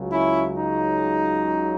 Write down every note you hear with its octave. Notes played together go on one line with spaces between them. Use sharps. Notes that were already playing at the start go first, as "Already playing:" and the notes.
Already playing: C#2 C#3 F#3
C#4 E4
D#4